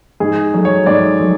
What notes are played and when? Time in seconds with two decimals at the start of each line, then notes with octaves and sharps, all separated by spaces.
0.20 G#2 G#4
0.54 F#3 A3
0.65 C#5
0.86 G#2 D5
1.20 F#3 A3